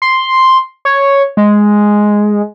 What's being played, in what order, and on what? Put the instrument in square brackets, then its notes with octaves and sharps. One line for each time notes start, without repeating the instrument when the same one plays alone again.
[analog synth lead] C6
C#5
G#3